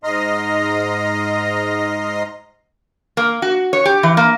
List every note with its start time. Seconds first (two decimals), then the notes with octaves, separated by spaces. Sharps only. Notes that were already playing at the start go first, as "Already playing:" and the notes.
0.04 G#2 D#5 A#5 C6 D#6 F6
3.17 A#3
3.42 F#4
3.73 C#5
3.85 G4
4.03 E3
4.17 A#3